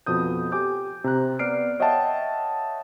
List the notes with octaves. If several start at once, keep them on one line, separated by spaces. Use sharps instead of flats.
F2 B2 D#6 G6
G4 G#5 D6 G6
C3 A#5 F#6
B3 D5 F6 C7 D7
C#5 D#5 E5 F#5 G5 A5